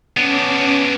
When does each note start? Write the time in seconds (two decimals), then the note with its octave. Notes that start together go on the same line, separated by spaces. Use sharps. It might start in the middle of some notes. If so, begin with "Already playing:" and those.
0.17 B3 C#4 D4 D6